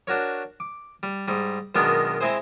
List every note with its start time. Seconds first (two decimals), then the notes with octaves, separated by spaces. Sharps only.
0.07 D4 F#4 A#4 C#5
0.60 D6
1.03 G3
1.28 G#2 G3
1.75 F#2 B2 D#3 G#3 B3 D4
2.21 G#3 C4 E4 G#4 C5